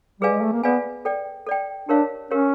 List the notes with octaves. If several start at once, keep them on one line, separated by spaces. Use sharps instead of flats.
G3 G#4 B4 D5 F5 G#5
G#3
A3
A#3
B3 G#4 B4 D5 F5 G#5
A4 D5 G5
A4 D5 G5
D4 G4 A#4 C#5 F5
C#4 G4 A#4 C#5 F5